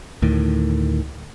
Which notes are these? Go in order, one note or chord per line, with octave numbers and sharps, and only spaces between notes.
D2 A2 D#3